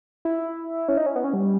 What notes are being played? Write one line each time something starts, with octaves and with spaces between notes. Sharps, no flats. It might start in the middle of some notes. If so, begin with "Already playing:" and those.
E4
C#4
D#4
C#4
B3
C#4
G3